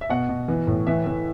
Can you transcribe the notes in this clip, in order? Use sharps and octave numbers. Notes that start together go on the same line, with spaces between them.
E5
B2 F#5
B2
E3
A2
E3 E5
E3